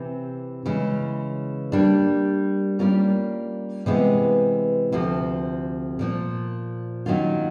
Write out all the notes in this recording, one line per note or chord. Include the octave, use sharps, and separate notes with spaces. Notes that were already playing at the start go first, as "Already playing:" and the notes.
Already playing: C3 E3
C#3 E3 G#3
G3 A#3 D4
G3 A#3 C#4 F4 A#4
C3 E3 G#3 B3
D2 C3 F3
A#2 F3 A#3
D#3 F#3 A#3 C#4 F4